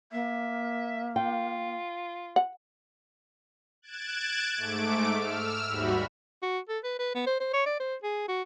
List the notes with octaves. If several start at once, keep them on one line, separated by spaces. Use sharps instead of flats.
A#3 E5
F4 G5
F#5
F#6 G#6 A6 D7 E7
G#2 A3 D6 D7
E6 F6
D#2 G#2 G3 F#4 E5 B5
F#4
A4
B4
B4
B3
C5
C5
C#5
D5
C5
G#4
F#4